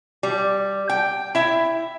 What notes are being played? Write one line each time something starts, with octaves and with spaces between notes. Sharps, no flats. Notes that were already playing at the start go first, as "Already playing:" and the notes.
G3
G5
E4 E5